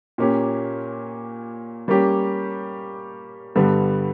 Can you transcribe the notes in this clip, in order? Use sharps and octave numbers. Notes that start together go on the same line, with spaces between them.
A#2 A#3 C#4 G4 C#5
G3 A#3 C#4 G4
G2 D3 G3 B3